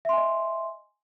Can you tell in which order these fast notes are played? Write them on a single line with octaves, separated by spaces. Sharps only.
E5 C6 G#5 D#5